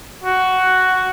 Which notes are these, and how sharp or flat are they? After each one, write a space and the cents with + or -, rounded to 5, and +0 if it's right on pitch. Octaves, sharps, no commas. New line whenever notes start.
F#4 +5